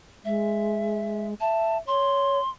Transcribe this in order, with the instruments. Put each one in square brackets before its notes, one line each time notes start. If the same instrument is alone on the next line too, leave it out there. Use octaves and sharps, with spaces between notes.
[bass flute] G#3 [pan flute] E5
[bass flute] E5 [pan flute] A5
[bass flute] C#5 [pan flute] C6